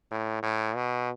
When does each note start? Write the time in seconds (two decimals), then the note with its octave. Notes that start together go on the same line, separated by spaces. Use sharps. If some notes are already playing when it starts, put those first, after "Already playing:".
0.11 A2
0.43 A2
0.76 B2